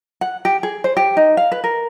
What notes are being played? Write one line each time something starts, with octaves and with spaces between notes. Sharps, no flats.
F#5
G4
G#4
C5
G4
D#4
F5
B4
A#4